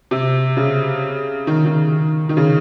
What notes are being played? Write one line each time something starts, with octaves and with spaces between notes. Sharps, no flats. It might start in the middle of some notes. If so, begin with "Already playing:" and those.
C3
C#3
D#3
D#3
D#3
C#3